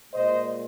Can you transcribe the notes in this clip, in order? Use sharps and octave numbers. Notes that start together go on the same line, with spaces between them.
A#2 G#3 C5 D#5